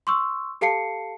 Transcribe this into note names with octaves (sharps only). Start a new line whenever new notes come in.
C6 C#6 E6
G4 A4 F5 A5 C7 C#7